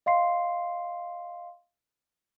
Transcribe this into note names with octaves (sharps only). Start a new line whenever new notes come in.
D#5 F5 C6 C7